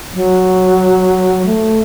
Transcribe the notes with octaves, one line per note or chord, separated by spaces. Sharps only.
F#3
A3